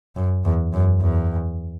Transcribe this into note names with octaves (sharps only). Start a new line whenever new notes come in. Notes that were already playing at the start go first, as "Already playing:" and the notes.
F#2
E2
F#2
E2